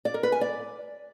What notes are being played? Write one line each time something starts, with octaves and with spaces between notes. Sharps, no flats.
D5
A#4
B4
G#5
D5